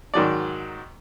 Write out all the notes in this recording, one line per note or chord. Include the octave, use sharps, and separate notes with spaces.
G#2 D#3 F#3 D5